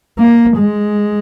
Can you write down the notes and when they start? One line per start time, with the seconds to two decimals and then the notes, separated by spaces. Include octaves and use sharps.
0.19 A#3
0.58 G#3